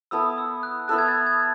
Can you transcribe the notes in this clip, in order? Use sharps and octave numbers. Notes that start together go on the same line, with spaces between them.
B3 E4 A4 E6
D#6
E6
F#6
B3 E4 A4 F#6
G#6
A6
G#6